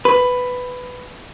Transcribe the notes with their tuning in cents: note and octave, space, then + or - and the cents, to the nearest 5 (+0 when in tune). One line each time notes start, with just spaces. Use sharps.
B4 +10